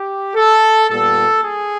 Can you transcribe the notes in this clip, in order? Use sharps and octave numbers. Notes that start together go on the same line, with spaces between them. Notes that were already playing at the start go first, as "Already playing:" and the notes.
Already playing: G4
A4
A#2 G3 B3 A4
G#4